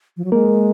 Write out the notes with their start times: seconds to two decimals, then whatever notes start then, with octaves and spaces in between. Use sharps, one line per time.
0.17 F3
0.24 F#3
0.32 G#3 A#3 A#4